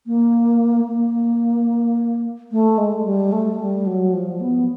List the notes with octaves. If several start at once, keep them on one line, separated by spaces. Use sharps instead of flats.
A#3
A#3
A3
G#3
G#3
G3
A3
G3
F#3
F3
B3